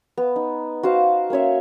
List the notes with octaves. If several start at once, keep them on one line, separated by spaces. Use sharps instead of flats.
B3
D#4
F#4 C5 F5
A#3 C#4 C#5 E5